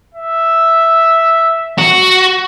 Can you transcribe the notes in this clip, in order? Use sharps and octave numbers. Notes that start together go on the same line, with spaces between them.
E5
F#4